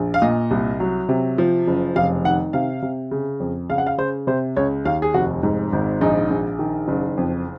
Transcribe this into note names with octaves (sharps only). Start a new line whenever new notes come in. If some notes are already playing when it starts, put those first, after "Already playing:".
Already playing: A#1
F5
A#2 D#5
C2
F#3
C3
F3
F#1
F1 F5
D#3 F#5
C3 F5
C3
C#3
F2
C#3 F5
F#5
F5
C#3 C5
C3 C5
C#2 C#5
D#2 F5
G#4
F1 F#4
G#2
G#1
A#1 D#4
A#1
D#3
F#1
F2